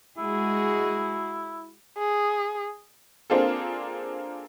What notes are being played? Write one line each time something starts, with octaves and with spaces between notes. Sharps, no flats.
G#3 E4 F#4 G#4
G#4
A#3 C4 D4 F4 G#4 A4